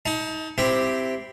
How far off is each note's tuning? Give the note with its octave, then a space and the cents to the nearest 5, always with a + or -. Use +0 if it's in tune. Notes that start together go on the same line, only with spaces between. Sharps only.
D#4 +30 A5 +0
C4 -10 E4 +5 G4 +0